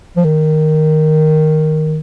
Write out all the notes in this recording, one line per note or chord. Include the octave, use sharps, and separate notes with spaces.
F3
D#3